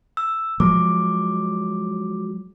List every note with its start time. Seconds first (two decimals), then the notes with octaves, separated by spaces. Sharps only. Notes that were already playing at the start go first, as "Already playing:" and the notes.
0.17 E6
0.60 F3 F#3 G#3 D6